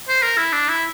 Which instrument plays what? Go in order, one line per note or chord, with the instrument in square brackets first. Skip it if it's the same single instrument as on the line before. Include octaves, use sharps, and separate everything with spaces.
[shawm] C5
A#4
E4
D4
E4